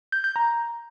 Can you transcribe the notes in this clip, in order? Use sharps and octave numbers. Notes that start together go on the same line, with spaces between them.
G6
G6
A#5